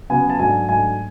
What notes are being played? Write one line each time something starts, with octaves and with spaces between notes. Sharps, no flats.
C#3 F#3 B3 G#5
A5
G#2 F#3 A3 D4 G#5
G#2 F#3 A3 D4 G#5